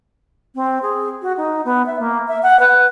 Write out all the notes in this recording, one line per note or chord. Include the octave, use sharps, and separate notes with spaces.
C4
G#4
F#4
D#4
B3
E5
A#3
E5
F#5
B4